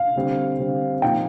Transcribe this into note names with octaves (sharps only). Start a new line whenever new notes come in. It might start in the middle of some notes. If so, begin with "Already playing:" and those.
Already playing: F5
D3 G3 C4
D3 G3 C4
A#2 F3 A#3 D#4 G5